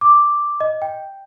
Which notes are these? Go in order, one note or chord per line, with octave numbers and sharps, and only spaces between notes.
D6
D#5
G5